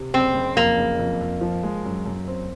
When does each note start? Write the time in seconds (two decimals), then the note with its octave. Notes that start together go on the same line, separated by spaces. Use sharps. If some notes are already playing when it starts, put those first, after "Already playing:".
Already playing: C3
0.14 F#1 C4
0.34 F#1
0.56 F2 A#3
0.77 F#1
0.99 F2
1.21 F2
1.41 F3
1.63 G#3
1.85 F#2
2.06 F#2
2.28 C4